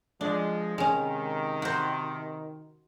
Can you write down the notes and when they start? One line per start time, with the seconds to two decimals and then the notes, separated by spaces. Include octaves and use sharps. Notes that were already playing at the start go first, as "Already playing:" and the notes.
0.21 F3 G#3 D4
0.78 C3 D#3 G#3 C#4
1.62 F#4 C5